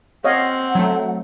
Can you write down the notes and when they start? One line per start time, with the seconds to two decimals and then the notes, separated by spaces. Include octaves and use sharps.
0.24 C4 C#5 D#5 F5 F#5
0.75 F#3 A3